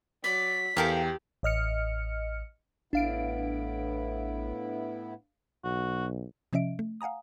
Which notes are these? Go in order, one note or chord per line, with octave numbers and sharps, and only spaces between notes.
F#3 D5 B6
E2 G4 A4 A#4 F5 G5
A1 D#5 F6 C#7
A1 A2 B3 D4 E4 F5 D7
B1 F#4
C3 F3 C#4 D#5 E5 D7
A3
F5 F#5 G#5 A#5 D#6